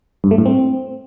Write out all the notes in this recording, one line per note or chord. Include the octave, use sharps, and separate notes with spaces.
G2
A3
A2
C4